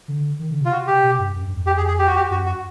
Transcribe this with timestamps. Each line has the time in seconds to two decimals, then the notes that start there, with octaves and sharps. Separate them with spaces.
0.08 D3
0.39 D#3
0.51 D3
0.61 C3 F4
0.72 F#4
0.87 G4
1.03 B2
1.19 G2
1.35 F#2
1.46 G2
1.56 F2
1.67 G4
1.77 G#4
1.88 G#4
1.99 G4
2.07 F#4
2.16 G4
2.31 F#2 F#4
2.46 F#4